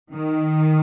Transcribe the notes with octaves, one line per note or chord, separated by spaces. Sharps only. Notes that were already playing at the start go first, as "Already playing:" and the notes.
D#3